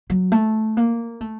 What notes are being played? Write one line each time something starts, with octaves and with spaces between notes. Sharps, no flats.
F#3
A3
A#3
A3